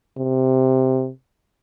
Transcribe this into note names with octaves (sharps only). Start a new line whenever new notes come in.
C3